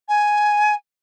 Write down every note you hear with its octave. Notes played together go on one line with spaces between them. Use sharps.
G#5